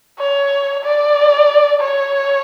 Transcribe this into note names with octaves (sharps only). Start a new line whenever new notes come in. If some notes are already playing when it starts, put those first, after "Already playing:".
C#5
D5
C#5